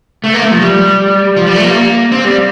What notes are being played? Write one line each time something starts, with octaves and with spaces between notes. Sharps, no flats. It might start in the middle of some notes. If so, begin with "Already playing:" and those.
A3
A#3
A3
F3
G3
F3
G3
A3
A#3
C4
G3